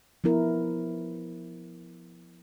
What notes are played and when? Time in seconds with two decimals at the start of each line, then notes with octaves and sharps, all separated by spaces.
0.24 F3 B3 E4 A#4